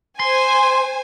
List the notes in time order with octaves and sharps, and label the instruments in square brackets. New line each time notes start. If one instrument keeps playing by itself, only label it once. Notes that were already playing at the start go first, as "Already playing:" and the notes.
[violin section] C5 G#5 [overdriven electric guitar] C6